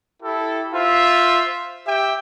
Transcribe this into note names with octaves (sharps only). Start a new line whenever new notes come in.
E4 G4 A4
F4 C5 E5
G4 E5 G5